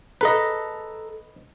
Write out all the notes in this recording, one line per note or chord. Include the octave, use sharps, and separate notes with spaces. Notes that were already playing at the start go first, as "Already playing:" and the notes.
A4 B4 D#5 A#5